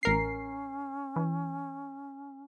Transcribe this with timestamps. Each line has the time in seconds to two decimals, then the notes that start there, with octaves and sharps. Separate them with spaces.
0.03 A1 C#4 A#4 C7
1.16 E3